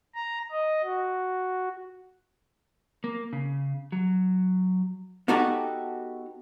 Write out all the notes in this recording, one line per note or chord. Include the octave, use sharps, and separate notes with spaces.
A#5
D#5
F#4
A#3
C#3
F#3
B3 D#4 F#4 G4 A4